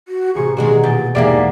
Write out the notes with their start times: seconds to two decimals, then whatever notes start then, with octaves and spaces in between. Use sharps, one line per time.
0.08 F#4
0.35 A1 C3 G#4 C#6
0.57 B2 D#3 G#3 A#3 D4 F#4 G#4
0.84 A#2 G6 A6 D7
1.15 E2 G#2 C3 A#3 G4 G#4 D5 E5